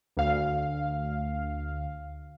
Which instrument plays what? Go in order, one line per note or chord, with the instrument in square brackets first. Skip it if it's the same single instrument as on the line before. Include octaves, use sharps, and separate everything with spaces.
[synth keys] D2 F5